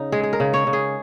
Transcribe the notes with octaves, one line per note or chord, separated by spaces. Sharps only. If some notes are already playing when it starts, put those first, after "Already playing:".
Already playing: C#3 D#4
G#3 G#4
G#4
A#4
C#3
C#5
C#3
G#4